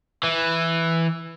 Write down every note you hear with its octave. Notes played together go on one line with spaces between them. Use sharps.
E3